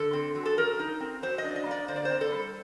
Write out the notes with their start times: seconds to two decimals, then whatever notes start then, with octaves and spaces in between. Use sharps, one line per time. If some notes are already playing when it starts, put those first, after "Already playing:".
Already playing: D3 A4
0.13 C4
0.35 F#3
0.46 A4
0.57 F#3 A#4
0.79 D#4
1.00 C4
1.23 F#3 C5
1.38 D#5
1.44 D4
1.56 D#5
1.66 A#3 D5
1.88 D3 C5
1.96 D5
2.05 C4 C5
2.21 A4
2.31 G3